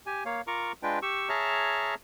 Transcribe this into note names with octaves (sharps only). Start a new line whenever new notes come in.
G4 G#5
A#3 C#5 F5
F4 A#4 A#5 C#6 D6
G#3 D4 F4 B4 G5
G4 C#6 E6
G#4 C#5 E5 A5 A#5 F6